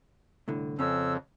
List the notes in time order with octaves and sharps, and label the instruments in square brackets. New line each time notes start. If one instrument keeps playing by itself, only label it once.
[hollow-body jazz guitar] C2 A2 D3
[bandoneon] F2 [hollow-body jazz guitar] C#3 C#4 [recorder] E6